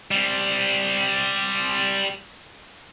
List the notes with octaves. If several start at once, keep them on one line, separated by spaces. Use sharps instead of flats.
G3 C4